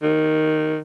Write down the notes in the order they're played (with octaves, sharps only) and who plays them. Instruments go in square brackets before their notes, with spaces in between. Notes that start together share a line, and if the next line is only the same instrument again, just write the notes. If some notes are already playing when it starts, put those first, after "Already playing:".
[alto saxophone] D#3